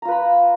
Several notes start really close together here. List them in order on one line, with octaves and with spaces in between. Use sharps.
A#5 F4 B4 B5